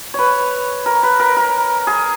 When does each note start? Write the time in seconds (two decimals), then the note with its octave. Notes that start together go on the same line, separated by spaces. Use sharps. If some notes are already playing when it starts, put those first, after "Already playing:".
0.14 B4 C#5
0.86 A#4
1.03 B4
1.20 A#4
1.37 A#4
1.87 G#4